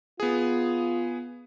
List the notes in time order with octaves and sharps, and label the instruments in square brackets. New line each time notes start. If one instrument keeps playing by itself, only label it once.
[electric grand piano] B3 G#4 [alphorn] F4